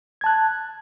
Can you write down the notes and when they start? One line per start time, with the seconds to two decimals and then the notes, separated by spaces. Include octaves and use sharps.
0.21 G#6
0.24 A5
0.26 F#6